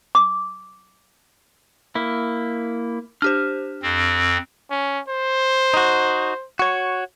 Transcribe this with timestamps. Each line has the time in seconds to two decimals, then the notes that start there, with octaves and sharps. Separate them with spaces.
0.15 D6
1.95 A#3 E4
3.22 D4 G4 C5 F6
3.82 F2 C4
4.70 C#4
5.08 C5
5.74 D#4 F#4
6.59 F#4 C#5